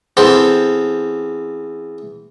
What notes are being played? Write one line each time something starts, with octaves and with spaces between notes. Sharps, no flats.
E2 C4 A4